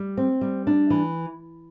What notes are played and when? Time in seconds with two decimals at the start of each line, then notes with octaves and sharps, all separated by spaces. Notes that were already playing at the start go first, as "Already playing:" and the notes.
Already playing: G3
0.17 C4
0.41 G3
0.67 D4
0.90 E3